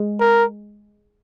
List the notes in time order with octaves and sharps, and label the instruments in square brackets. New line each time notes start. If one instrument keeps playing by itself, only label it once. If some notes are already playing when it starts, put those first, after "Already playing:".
Already playing: [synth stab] G#3
[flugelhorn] A#4